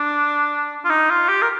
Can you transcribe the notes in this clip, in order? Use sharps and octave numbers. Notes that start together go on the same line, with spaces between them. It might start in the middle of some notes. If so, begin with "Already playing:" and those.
Already playing: D4
F4
D#4
F4
G4
A#4